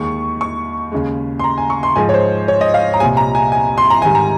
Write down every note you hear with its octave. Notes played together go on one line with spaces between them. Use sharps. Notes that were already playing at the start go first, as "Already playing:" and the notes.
Already playing: D#2 D#3 G#3 C#6
C#6
D#2 C#3 G#3
C6
A#5
G#5
C#6
C6
G#2 F3 G#3 G#5
C#5
C5
C#5
D#5
F5
A#5
C2 A#2 G3 G#5
A#5
G#5
G#5
C6
A#5
G#2 D#3 G3 G#5
A#5